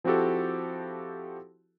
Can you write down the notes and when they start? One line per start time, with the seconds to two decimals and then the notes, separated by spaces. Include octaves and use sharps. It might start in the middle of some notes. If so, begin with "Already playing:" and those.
0.04 F3 C4 E4 F#4 G4 A4